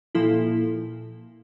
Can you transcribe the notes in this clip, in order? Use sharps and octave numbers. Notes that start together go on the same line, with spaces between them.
A#2 F3 A#3 E4 A4